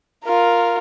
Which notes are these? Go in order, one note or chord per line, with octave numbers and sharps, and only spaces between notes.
F4 A#4